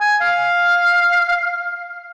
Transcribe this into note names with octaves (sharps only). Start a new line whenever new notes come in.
G#5
F5